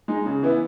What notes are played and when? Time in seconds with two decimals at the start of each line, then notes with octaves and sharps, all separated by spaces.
0.08 G#3 D#4
0.26 C#3
0.42 E3 B3 E4